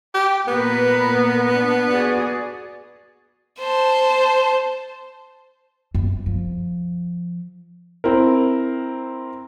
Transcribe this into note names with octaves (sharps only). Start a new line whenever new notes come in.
G4
A#2 B3 A#4 B4
D4
F#4 G#4 D5
C5 A5
F#2
F3
C4 E4 A#4